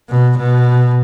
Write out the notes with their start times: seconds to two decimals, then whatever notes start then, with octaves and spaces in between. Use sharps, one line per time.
0.09 B2
0.38 B2